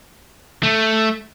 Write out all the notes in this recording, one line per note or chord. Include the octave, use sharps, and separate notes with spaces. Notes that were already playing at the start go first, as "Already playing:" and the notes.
A3